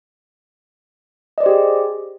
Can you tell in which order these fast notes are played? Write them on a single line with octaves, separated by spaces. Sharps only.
D#5 D5 C5 G4 G#4